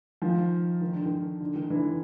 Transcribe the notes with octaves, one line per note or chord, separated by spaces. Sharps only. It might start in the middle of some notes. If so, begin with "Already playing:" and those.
D#3 F3
D#3
D3
D#3
D3
D#3
D3 E3